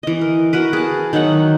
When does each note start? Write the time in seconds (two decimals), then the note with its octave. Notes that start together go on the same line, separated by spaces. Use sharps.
0.03 E3 D#5
0.21 A#4
0.53 F#4 A#4 B4
0.73 G#4 A5
1.13 D#3 F#3 D#4 F#5